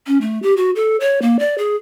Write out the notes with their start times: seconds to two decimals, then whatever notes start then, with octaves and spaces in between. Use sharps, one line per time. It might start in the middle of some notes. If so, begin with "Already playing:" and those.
0.07 C#4
0.21 A3
0.43 G4
0.57 F#4
0.76 A4
1.00 C#5
1.22 A#3
1.39 D5
1.58 G#4